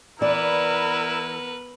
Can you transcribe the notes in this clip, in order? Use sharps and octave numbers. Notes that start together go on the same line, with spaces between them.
E3 B3 E4 A#4 B4 D5